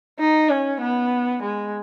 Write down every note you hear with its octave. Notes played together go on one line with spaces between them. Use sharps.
D#4
C#4
B3
G#3